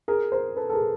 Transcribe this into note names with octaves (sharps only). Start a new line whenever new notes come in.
G#4 A#4
A#4 C5
A4 B4
A4
G#4 A#4